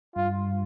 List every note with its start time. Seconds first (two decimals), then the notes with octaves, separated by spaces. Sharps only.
0.15 G2 F4